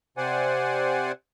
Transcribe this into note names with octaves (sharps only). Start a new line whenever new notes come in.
C3 C5 D5 F#5 G#5